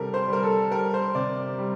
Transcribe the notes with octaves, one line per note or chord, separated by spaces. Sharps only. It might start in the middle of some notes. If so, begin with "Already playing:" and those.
Already playing: C3 G3 G4 A4 A#4
C5
G3 A#4
A4
G3 A#4
C5
C3 D5
G3